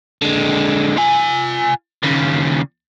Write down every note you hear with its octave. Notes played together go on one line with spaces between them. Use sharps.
D3 G#3
F4 G#5
D#2 C#3